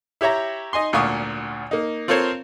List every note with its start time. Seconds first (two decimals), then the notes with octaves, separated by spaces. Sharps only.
0.21 E4 G4 C#5 E5 A#5
0.73 D#4 D#5 G#5 C6
0.93 G#1 D2 A#2 F5 C#6 D#6
1.71 A#3 D#4
2.08 C4 F4 A4 A#4 C5 C#5